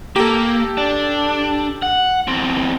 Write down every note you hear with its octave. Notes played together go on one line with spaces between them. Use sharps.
A#3 G4 A4
D4
F#5
E2 C4